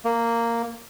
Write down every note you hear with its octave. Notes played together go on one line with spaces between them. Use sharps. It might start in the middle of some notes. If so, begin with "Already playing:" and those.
A#3